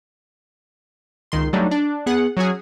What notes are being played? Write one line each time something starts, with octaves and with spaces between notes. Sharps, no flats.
C#2 D#3 C6
F#3 G3 A3 D4 D#4
D4
B3 G#4 F#5
F#3 C#4 F#4 G#4